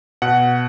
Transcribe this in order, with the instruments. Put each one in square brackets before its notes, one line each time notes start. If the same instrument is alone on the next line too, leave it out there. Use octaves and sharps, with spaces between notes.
[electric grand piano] B2 F#5